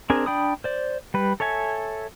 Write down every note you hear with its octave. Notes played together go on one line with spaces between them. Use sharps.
C4 D4 G#4 A#4 G#5
D4 D5 G5 B5 D#6
C5 D5
G3 B4
A4 C#5 E5 G#5